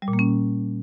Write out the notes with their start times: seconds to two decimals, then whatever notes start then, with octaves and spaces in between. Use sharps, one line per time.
0.02 G3
0.08 A#2
0.13 A#3
0.19 C#4